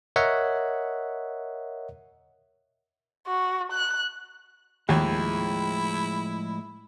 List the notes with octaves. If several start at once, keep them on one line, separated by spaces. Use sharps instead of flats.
A#4 C#5 D#5 E5 F#5
F#4
F#6
D#2 A2 F3 G#3 E4